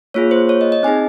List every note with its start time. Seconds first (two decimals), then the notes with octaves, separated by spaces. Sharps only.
0.14 A#3 F4 G#4 C#5
0.31 C5
0.49 C#5
0.61 D#5
0.72 D#5
0.83 C4 D#4 G#4 G#5